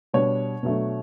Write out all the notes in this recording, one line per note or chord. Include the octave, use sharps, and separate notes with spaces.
B2 G3 D4 C#5
B2 F#3 A3 D4